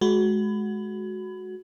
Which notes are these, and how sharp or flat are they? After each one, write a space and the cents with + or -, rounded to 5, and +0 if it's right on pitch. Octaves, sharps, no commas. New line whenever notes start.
G#3 +25 F#4 +0 B5 +20